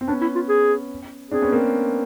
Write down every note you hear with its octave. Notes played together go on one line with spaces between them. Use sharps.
C4
B3 C#4 D4
E4
F4
G#4
C4 D4 G#4
B3 C#4
A#3 C4